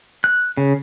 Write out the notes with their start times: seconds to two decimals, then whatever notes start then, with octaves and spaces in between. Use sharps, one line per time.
0.24 F#6
0.57 C#3